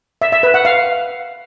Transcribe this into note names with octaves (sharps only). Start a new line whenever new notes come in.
E5
E5
B4
F#5
F5